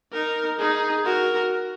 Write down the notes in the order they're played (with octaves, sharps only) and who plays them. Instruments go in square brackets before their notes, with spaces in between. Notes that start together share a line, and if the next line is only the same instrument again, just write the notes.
[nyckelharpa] D#4 [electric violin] A#4
[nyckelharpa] D#4 [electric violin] G#4
[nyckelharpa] F#4 [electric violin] A#4